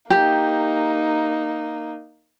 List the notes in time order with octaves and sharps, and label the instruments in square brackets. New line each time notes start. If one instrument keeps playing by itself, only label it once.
[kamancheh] A#3 D#4 [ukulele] G4